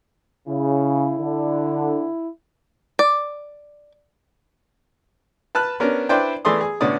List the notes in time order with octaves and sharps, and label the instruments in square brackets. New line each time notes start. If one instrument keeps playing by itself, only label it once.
[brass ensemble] C#3 [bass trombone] E4
[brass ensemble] D3
[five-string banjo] D5
[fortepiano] B4 A5 F6 F#6
B3 C#4 D4 A#4
D4 E4 B4 C5 D5 G5
E3 A3 G#4 D5 C6 D#6
G#4
A2 D3 B3 C#4 D5 D#6